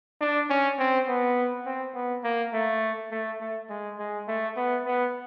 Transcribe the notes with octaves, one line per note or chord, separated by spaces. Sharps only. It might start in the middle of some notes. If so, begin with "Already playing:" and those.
D4
C#4
C4
B3
C4
B3
A#3
A3
A3
A3
G#3
G#3
A3
B3
B3